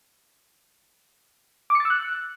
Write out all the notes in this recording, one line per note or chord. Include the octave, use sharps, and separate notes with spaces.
D6
C#7
A6
E6
F#6